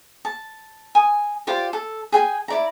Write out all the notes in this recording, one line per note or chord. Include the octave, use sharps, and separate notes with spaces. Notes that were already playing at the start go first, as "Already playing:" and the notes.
A5
G#5 D#6
F4 G4 C5 D5
A4
G#4 G5 G#5
E4 D5 A#5